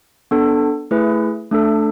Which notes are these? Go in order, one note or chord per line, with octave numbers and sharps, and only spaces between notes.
B3 D4 A4
A3 E4 G#4 B4
A3 D4 A4